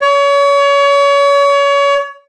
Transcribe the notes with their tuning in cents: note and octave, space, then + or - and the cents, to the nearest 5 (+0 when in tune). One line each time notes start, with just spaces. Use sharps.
C#5 +30